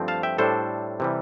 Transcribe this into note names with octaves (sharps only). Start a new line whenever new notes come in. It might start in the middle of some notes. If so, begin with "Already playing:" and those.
Already playing: G2 F3 A3 C4
F5 A5
E5 G5
A2 G3 D4 A4 C5
C3 E3 G3